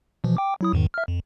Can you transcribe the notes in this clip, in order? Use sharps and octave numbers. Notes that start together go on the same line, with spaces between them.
B2 E3 F3
G5 D6
F#3 E4 D#6
E2 G#2 D#3
E5 F6
F2